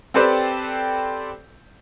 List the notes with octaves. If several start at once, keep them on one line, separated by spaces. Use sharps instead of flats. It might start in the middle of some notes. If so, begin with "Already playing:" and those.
C4 G4 A4 B4 C5 D5